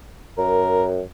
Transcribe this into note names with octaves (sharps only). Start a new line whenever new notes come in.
F#2 A#4